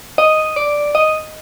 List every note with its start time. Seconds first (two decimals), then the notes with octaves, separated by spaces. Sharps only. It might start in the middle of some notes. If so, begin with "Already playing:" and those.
0.18 D#5
0.56 D5
0.95 D#5